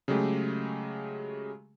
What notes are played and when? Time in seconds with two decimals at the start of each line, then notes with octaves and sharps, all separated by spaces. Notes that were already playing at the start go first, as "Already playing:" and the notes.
0.08 C#3 F#3 G#3 A3 G4